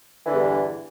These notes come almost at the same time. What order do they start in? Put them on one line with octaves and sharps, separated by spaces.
E3 D3 E2 G2